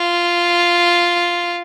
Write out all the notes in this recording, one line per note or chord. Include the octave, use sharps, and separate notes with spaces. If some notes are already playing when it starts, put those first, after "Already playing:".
Already playing: F4